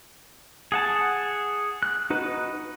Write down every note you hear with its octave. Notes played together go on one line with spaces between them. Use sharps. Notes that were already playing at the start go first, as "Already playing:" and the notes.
G#4 F#5 A5
F#6
D#4 F#4 B4